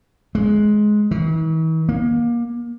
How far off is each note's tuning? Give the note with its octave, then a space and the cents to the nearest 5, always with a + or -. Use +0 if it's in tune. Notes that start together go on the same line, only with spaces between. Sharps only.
G#3 +15
E3 -45
A#3 +25